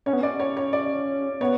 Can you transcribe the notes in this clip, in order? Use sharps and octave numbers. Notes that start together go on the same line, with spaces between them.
C#4 C#5
B3
C#4 D5
C#5
C#5
D5
B3 C#5